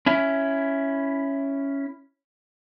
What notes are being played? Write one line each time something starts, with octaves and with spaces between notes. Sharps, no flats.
C#4 E4